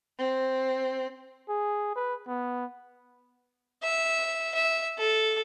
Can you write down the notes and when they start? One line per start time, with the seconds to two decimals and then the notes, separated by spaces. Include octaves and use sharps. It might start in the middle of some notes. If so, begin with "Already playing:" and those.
0.18 C4
1.49 G#4
1.95 B4
2.27 B3
3.83 E5
4.55 E5
4.98 A4